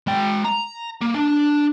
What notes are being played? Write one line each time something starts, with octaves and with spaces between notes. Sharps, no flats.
G#3 G5
A#5
A#3
D4